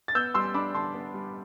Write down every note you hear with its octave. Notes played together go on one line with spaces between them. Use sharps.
A6
B3 E6 G6
G3 C6 E6
D4 B5 D6
D3 A5 C6
B3
G3